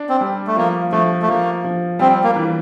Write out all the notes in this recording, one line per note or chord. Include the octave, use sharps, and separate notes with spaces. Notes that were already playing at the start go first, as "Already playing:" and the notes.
Already playing: D4
C4
G3
A3
F3 A#3
F3 A3
A3
F3 A#3
F3
G3 C4
A#3
E3